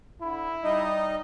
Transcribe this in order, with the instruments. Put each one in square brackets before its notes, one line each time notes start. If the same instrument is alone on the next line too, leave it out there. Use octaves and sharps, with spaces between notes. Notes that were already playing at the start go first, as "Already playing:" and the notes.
[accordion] D3 [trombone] E4
[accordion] G3 D#4 D#5